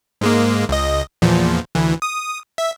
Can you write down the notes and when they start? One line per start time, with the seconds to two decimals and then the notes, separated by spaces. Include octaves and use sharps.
0.21 G#2 G#3 A#3
0.69 C#2 D#5
1.22 E2 A#2 F3
1.75 D2 E3
2.02 D#6
2.58 E5